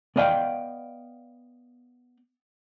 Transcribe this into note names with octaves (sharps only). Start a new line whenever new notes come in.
B3 D5 D#5 F5 G5